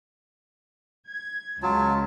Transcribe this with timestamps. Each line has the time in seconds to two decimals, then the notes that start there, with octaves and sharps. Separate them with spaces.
1.07 G#6
1.63 C#2 F#3 F4 A5